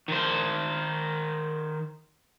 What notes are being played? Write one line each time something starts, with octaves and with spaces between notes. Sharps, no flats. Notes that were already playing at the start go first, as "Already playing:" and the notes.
D#3 C5